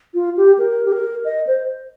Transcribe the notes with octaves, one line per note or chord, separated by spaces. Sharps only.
F4
G4
A#4
G4
A#4
D#5
C5